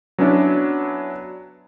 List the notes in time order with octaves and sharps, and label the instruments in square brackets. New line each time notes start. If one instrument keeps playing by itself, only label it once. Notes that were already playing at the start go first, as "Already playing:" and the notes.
[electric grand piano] F#3 B3 C#4 D4 E4